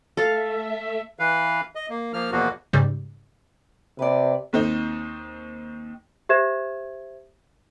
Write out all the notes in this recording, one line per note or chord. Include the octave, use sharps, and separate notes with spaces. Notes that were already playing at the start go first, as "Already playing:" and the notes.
A3 A4 E5 F5
E3 B4 F5
D#5
A#3
F3 A#3 F6
E2 B2 F3 A#3 F#4
G#2 C#3 G3
C3 B4 D5
D#2 C4 D#4
G4 C5 E5 G#6 E7